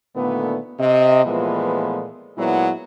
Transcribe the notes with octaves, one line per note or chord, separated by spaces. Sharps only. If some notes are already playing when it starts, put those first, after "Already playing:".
A#2 D3 D#3 A3 B3
C3 D#5
A#2 E3 F3 G#3 A3 B3
A#2 F#3 G#3 B3 E4